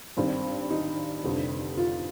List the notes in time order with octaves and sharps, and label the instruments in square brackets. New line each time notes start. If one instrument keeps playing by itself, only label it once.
[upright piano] G#1 G2 D#3 G3 D4 [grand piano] C4
[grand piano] D#4
[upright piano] F1 F2 D3 G3 C4
[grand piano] F4